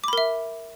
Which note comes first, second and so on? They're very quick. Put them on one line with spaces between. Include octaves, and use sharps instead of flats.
D6 B5 A#4 E5